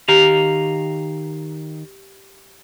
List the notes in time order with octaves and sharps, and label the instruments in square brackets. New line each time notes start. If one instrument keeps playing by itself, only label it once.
[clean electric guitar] D#3 F5 A#5 [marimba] G4